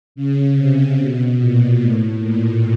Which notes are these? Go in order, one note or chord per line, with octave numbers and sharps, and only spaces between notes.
C#3
C3
B2
A#2
A2
A#2